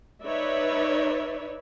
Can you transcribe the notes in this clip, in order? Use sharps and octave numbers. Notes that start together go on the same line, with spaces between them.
D#4 B4 C#5 D5 E5